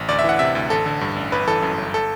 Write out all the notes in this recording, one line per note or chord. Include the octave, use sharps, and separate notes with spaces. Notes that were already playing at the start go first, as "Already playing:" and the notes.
Already playing: A1
D2 D5
E5
E3 F#5
C3 E5
D2
A1 A4
D3
G2
A1
G1 B4
E3 A4
F#2
G1
A4